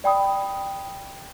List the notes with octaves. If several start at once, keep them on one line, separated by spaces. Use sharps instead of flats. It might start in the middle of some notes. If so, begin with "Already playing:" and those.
D5 G5 B5 D#6